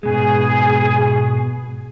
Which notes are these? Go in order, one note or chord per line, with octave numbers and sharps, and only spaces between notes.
G#2 B2 G#3 G#4